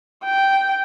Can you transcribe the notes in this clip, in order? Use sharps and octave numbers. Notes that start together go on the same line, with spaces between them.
G5